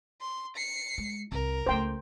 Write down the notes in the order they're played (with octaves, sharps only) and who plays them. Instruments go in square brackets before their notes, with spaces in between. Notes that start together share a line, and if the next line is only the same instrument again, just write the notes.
[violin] C6
C7 C#7
[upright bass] G#3
[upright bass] C2 [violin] A#4
[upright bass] C#2 A3 [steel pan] C5 G5